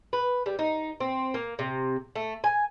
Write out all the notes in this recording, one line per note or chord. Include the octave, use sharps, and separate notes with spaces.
B4
G3
D#4
C4
A#3
C3
A3
G#5